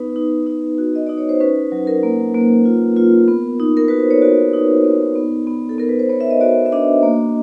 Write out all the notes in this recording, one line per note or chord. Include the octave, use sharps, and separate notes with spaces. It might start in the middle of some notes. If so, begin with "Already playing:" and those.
Already playing: B3 D#4 B4
D#4
D#4
F#4
D#5
D#4 D5
C#5
C5
C#4 B4
F#3
A#4
A#3
A#3
F4
F4
B3
D#4
A#4
F#4 B4
C5
C#5
F#4 D5
D#4
B3
B3
B3
A4
B3 A#4
B4
C5
B3 C#5
E5
D#5
F#4 D5
E5
D4 D#5
A#3